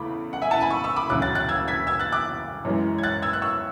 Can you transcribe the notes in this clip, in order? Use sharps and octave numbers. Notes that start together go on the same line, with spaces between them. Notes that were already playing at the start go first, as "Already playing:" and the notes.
Already playing: E2 C#3 A3 B5 D6
F#5
E5 G#5
F#5 A5
G#5 B5
C#6 E6
C#6 E6
B5 D6
E1 D2 C#3 F#3 D6 F#6
F#6 A6
F#6 A6
E6 G#6
G#6 B6
E6 G#6
F#6 A6
D6 F#6
F#2 E3 G#3
G#6
F#6 A6
E6 G#6
F#6
C#6 E6